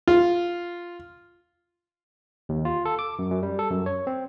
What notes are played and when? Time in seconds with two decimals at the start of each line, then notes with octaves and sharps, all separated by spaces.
0.08 F4
2.49 D#2
2.65 F4
2.85 A4
2.99 D6
3.19 F#2
3.31 F#2
3.43 G3
3.59 A4
3.70 F#2
3.86 C#5
4.07 C4